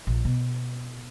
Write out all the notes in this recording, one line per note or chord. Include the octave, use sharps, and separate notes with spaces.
A#1
B2